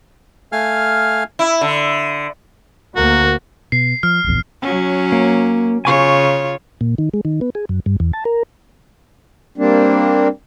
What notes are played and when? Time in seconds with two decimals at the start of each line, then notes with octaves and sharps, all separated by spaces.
0.52 A3 F5 G#5 F6
1.39 E4
1.61 D3
2.96 D2 A#3 F#4
3.72 B2 C7
4.03 F3 F6
4.24 D1 A#1 E2
4.61 F#3 C#4
5.12 A#3
5.85 C#3 F4 C#5 G#5 C#6
6.81 A#2
6.98 D#3
7.14 G#3
7.25 D#3
7.41 B3
7.55 G#4
7.69 F#2
7.86 G2
8.00 E2
8.13 A5
8.25 A#4
9.58 G3 A#3 C4 D4